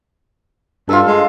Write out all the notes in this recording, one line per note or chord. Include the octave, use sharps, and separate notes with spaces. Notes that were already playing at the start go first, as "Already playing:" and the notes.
G2 F4 A4
G#3